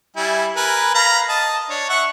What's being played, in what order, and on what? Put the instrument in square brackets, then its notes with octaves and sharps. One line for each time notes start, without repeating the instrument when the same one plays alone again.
[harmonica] G3 E4 G#5
A#4 B4 G#5
F5 A#5 B5
D#5 A5
D4 C#5
E5 F#5 C#6